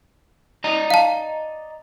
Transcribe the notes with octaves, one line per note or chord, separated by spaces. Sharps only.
D5 D#5 A#5
F5 A5